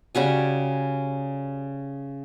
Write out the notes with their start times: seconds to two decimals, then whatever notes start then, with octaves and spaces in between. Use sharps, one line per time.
0.15 C#3 G3 F#4 G#5